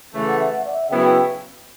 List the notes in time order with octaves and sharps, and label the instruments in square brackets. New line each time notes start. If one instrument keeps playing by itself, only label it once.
[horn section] C#3 E3 A3 [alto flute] B4
[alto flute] F#5
E5
F#5
D5
E5
[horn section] C#3 F#3 B3 E4 [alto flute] G5